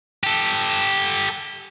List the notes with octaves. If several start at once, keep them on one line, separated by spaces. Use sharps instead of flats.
G4 A4